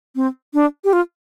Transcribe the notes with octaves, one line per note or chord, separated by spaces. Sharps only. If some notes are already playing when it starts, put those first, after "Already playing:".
C4
D4
G4
F4